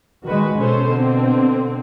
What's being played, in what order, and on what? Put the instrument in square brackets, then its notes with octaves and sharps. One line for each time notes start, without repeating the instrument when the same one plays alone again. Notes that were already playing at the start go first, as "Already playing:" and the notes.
[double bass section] D#3 G#3 [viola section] F#4 B4
[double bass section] B2 [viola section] C#4 A4 C5
[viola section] D3 C4